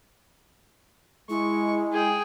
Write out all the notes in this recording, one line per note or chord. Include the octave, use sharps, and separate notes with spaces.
G#3 E4 C#6
G#4 G5